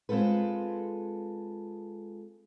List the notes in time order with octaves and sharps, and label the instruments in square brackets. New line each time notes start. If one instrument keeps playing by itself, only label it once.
[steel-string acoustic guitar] G#3 C4 F4 A4 B4